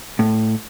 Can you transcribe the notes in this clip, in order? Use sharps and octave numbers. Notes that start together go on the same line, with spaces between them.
A2